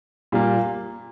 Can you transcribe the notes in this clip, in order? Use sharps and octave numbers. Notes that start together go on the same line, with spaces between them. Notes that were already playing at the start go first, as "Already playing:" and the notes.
A#2 G3 A#3